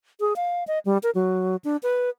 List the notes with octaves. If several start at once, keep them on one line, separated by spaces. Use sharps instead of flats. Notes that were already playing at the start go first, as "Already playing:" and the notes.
G#4
F5
D#5
G3
A#4
F#3
D4
B4